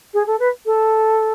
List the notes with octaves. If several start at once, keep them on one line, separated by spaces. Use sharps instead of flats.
G#4
A4
B4
A4